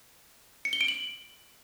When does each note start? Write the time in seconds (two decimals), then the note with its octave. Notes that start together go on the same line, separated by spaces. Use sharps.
0.65 C#7
0.73 G7
0.81 D7
0.88 F#7